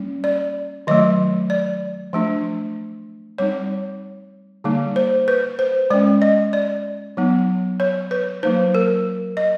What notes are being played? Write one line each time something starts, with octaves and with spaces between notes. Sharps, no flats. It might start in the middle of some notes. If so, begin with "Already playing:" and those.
Already playing: G3 A#3 C#4
D5
D#3 F#3 A3 D#5
D5
F3 A3 D4
G3 C4 D#4 C#5
D3 G3 A#3 D#4
C5
B4
C5
G#3 C#4 D5
D#5
D5
F#3 B3 D#4
C#5
B4
F#3 A#3 D#4 C5
A#4
D#5